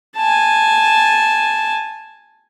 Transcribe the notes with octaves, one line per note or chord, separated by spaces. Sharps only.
G#5 A5